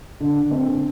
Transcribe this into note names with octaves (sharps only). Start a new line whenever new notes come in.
D3
C4